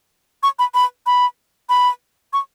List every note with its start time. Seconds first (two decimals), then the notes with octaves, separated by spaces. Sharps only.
0.43 C#6
0.59 B5
0.75 B5
1.06 B5
1.69 B5
2.33 C#6